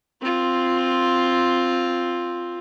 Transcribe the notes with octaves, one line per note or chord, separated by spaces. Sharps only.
C4 F4